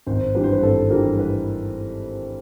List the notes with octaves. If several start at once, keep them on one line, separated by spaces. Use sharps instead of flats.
G#1 C5
G2 E3 G3 B4
C5
B4
G#1 A4
G2 E3 G3 A#4
B4